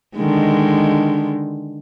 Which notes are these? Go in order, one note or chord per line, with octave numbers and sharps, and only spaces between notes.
D3 D#3 G#3